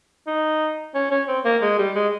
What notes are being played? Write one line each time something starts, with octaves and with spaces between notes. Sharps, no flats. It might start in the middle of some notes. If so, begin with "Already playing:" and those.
D#4
C#4
C#4
C4
A#3
G#3
G3
G#3